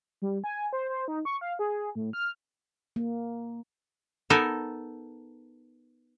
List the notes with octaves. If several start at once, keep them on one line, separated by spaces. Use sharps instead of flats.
G3
G#5
C5
C5
D#4
C#6
F5
G#4
A2
F6
A#3
B3 D#4 A4 A#4 D#5 G#5